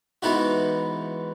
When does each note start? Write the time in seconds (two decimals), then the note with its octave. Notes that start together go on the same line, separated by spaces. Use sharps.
0.22 G#2 E3 B3 D#4 F#4